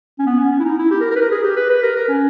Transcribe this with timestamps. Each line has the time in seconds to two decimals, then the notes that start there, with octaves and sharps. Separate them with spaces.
0.19 C#4
0.26 B3
0.39 C#4
0.52 C#4
0.59 E4
0.65 D#4
0.78 E4
0.91 G4
1.00 A#4
1.11 A#4
1.16 B4
1.21 A#4
1.31 G#4
1.44 G4
1.56 B4
1.70 B4
1.83 A#4
1.96 A#4
2.09 C#4